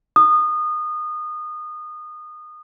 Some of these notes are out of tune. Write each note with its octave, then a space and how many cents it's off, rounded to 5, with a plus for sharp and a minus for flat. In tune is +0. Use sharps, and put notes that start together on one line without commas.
D#6 -25